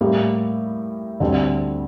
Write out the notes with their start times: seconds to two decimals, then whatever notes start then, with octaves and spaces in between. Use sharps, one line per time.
0.01 A2 G3 A#3 E4 G4
1.20 D2 D3 G3 C4